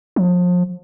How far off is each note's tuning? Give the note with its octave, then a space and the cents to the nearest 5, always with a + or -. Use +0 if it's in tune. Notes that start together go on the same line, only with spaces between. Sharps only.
F3 +35